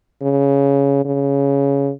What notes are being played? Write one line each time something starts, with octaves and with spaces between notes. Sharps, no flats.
C#3
C#3